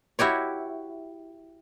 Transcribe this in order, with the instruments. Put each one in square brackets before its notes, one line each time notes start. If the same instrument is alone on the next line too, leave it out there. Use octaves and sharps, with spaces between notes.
[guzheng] E4 F#4 G4 C#5